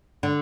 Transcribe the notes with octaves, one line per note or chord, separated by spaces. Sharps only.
D3